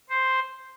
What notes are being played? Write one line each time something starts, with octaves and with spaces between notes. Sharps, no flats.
C5